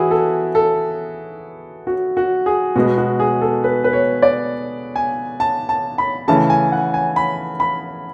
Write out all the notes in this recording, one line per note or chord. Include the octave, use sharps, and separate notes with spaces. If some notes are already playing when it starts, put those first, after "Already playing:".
Already playing: E3 B3 E4 F#4 G#4
A4
A4
F#4
F#4
G#4
B2 G#3 B3 F#4
F#4
G#4
A4
B4
B4
C#5
D5
G#5
A5
A5
B5
C#3 E3 A3 A5
G#5
F#5
G#5
B5
B5